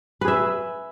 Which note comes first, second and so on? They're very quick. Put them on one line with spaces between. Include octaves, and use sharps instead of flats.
B4 G#4 E5